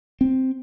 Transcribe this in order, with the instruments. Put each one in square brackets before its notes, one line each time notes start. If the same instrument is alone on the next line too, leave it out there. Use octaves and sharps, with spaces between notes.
[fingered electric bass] C4